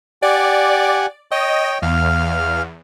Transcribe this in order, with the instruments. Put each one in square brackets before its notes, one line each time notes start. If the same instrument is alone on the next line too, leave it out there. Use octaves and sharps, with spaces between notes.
[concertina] G4 F#5 G#5 [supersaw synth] D5
[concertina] C#5 G5 [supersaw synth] D#5
[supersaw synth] E2 [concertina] F5 F6